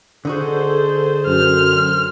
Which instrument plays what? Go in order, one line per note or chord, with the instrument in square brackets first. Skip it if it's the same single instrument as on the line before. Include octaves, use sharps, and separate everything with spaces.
[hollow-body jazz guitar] D3 D#4 F#4 [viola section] G#4 A4 C5
[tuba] F#2 [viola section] C5 [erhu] F6